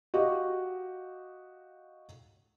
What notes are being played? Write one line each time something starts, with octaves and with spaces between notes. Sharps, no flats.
F#4 G4 D#5 F5